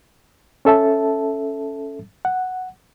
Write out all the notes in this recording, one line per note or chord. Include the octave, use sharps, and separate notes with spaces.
C#4 A4 E5 A5
F#5